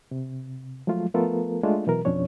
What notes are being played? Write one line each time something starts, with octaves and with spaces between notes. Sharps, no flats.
C3
F3 F#3 G#3 A3 F4
F3 A3 B3 F4 A4 A#4
G#3 A3 D4 F4
B2 E3 F#3 A#4
F2 B2 F3 C#4 D4 C#5